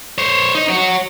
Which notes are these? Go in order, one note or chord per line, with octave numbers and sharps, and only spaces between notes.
C5 C#5
D#4
F#4 C#5